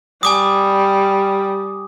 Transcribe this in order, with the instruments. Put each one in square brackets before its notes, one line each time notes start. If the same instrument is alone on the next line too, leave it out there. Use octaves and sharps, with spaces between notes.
[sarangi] G3 [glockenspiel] G#5 D6 D#6